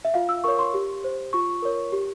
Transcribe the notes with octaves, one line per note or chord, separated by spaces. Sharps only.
E5
F4 F5
E6
A#4 C#5 C#6
C6
G4
C5
F4 C#6
A#4 C#5
G4